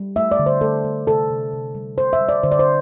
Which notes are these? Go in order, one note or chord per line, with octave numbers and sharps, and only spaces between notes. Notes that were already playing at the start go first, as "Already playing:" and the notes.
Already playing: G3
A3 E5
D5
D3
C5
A3 A4
A3
C3 A4
C3
C3
G3
G3 C5
E5
G3
D5
D3 C5
D5
C5